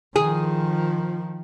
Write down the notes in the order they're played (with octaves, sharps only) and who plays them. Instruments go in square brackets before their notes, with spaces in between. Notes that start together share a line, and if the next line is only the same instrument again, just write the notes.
[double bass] D#3 F3 [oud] G#4